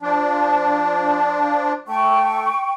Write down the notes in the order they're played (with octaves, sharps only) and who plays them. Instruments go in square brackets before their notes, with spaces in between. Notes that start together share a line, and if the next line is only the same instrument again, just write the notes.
[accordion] F3 D4
[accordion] A3 [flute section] G5 C#6